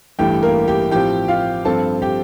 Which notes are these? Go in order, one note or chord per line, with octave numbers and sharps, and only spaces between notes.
A1 G2 E3 A3 G4 G5
A#3 A#4
G4 G5
A2 F3 C4 G4 G5
F4 F5
G2 F3 C4 F4 A4 A5
G4 G5